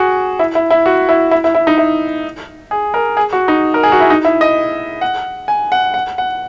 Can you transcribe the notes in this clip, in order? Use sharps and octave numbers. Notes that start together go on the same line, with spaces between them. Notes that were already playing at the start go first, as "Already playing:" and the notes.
Already playing: F#4 G#4
E4
E4
E4
F#4
E4
E4
E4
E4
D#4
E4
G#4
A#4
G#4
F#4
D#4
A#4
G#4
F#4
E4
D#4
E4
D#5
F#5
G#5
F#5
F#5
F#5